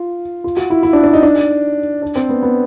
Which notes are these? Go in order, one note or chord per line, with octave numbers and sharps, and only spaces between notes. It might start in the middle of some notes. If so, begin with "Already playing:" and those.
Already playing: F4
F4
F#4
E4
E4
D4
D4
D#4
D4
D4
C4
B3
B3